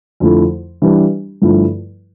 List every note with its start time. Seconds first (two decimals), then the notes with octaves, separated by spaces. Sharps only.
0.20 F2 D3 F3 A3 E4
0.82 E3 G3 D4 G4 B4
1.42 G2 D3 F3 A3 E4